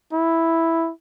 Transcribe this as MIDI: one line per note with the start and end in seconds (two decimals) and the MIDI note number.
0.13 0.91 64